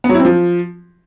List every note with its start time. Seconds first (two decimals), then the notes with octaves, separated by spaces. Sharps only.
0.04 B3
0.09 F#3
0.14 E4
0.20 C4
0.25 F3